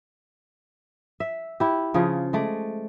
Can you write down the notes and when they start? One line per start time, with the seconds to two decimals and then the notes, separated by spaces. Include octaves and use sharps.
1.20 E5
1.60 E4 G4
1.94 C#3 F3 G#4
2.33 G#3 A3 D5